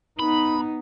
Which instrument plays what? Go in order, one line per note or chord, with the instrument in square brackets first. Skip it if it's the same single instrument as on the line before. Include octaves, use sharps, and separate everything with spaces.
[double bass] B3 D#4 [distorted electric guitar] B5